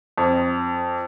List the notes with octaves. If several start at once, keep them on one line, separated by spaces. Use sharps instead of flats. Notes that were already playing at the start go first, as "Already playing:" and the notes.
F2